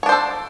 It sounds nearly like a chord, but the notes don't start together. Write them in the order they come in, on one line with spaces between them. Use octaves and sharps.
C#5 D4 C5 A4